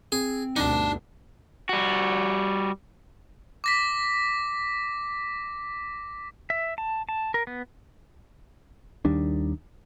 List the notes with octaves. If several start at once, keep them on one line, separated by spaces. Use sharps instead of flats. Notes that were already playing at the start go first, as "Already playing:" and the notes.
C4 G#4
D2 G2 B2 D4 D#4 A5
G3 F#4
D6 A#6 B6
E5
A5
A5
A#4
B3
D#2 D#3 G3 D4